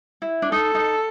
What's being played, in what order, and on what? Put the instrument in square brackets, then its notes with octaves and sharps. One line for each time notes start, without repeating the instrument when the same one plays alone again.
[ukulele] E4
D4
[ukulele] D#4 [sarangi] A4
[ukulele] D#4